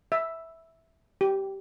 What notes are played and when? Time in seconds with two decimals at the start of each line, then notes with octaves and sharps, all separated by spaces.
0.12 E5
1.21 G4